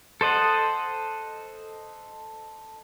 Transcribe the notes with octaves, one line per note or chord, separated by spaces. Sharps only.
A4 C5 D#5 F#5